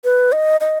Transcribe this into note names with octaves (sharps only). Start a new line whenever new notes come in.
B4
D#5
D#5